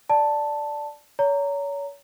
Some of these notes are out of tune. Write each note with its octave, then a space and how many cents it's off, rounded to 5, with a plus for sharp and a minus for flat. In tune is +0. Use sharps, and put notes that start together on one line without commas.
D5 +0 A5 +5
C#5 +35 A#5 -15